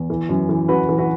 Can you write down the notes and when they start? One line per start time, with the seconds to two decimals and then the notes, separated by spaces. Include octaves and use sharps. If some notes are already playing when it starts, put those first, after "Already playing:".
Already playing: E2
0.10 E3
0.29 F#2
0.49 E3
0.68 F#2 F#4 B4
0.89 E3
0.98 F#4 B4